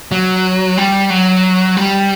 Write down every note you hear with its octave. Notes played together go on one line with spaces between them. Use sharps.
F#3
G3
F#3
G3